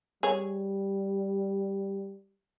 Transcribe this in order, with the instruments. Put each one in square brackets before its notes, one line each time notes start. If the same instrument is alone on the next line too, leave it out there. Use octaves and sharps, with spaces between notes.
[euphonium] G3 [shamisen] G#4 C#5